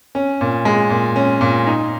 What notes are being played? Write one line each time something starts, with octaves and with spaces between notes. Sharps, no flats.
C#4
A#2
G#3
A#2
C#4
A#2
D#4